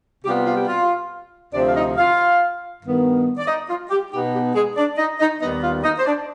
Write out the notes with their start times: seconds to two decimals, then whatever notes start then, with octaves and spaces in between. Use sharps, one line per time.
0.24 C3 G3 B3 F4 G4
0.46 F4
0.57 G4
0.67 F4
1.54 D2 C3 F3 C4 D4 D5
1.68 F5
1.75 D#4 D#5
1.97 F4 F5
2.82 G2 D#3 B3
3.37 D5
3.47 D#4 D#5
3.69 F4
3.90 G4
4.11 B2 B3 D#4 G4
4.33 G4
4.54 G#3 G#4
4.76 D4 D5
4.98 D#4 D#5
5.19 D#4 D#5
5.40 D#2 D#3 G3 B3 D#4 D#5
5.62 F4 F5
5.83 D#4 D#5
5.98 C5
6.05 D4 D5